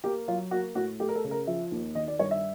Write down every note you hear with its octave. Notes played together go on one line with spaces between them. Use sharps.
A#3 G4
F#3 F4
A#3 F#4
A2 F#4
A3 G4
A#4
A4
C#3
A#4
F3 E5
D#2
D#3 D#5
D5
G2 C#5
E5